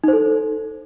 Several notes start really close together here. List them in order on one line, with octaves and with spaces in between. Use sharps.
D#4 C5 A4